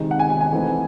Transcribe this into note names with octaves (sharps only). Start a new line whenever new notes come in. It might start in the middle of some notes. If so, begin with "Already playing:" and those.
Already playing: C3 D#3 G#3 D#4
F#5
G#5
G#5
G#5
E3 A3 C4 D#4